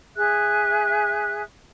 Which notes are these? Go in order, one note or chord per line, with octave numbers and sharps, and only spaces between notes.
G#4 E5 F#6